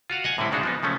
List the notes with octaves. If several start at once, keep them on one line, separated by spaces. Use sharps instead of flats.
F4 F#4 F5 F#5
D#5 F#5 G#5
A2 D3 G3 C4 E4
C#3 G#3 D4 D#4 F#4
F3 B3 D#4
C#3 F3 A3 C#4